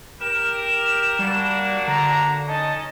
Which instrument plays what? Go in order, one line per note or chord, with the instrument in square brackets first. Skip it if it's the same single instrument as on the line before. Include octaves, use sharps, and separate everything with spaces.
[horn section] G4 A#4 [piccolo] E7
[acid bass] G3 [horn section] A#3 D4 F#4
[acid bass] D3 [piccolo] A#5
[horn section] C#4 D#4 D#5 [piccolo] A5